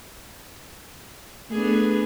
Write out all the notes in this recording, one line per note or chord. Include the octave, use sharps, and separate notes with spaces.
A3 B3 D4 G#4